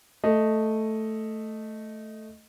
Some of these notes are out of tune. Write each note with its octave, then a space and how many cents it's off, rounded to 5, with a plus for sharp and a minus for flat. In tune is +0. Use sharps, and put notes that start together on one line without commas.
A3 +0 D#5 +0